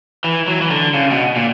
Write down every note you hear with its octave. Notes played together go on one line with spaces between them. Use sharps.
E3
F#3
E3
D3
C#3
B2
A#2